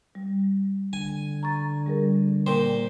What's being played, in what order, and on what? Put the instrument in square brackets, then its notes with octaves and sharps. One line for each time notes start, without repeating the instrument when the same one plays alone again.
[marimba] G3
[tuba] D3 [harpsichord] G#5
[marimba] A#5 C#6 A6
G3 G#4 A#4
[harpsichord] A#2 C5 [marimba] G5